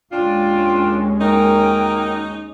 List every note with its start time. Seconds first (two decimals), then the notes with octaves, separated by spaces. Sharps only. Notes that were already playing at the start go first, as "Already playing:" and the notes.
0.12 D#2 G#3 C#4 D4 F4 G5
1.21 A#3 D#4 F#4 A#4 G5